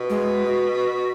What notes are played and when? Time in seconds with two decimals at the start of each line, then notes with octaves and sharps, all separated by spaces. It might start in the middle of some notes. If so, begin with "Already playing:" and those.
Already playing: B2
0.10 G#3
0.46 F#4